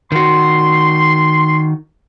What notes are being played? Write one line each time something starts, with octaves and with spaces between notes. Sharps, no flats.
D#3 F#4 C6